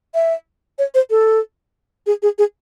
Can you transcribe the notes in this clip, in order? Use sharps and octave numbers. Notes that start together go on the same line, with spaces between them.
E5
C#5
C5
A4
G#4
G#4
G#4